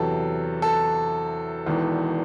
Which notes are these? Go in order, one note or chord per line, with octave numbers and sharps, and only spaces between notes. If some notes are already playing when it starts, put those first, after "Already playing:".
Already playing: E2 C3 F#3 A4
A4
E1 E2 D#3